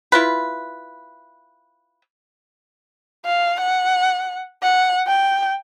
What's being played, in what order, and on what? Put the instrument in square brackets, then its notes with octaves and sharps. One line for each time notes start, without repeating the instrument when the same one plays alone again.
[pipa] E4 F4 B4
[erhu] F5
F#5
F#5
G5